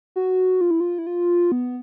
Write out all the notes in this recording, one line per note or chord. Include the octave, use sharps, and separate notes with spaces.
F#4
F4
E4
F4
E4
F4
B3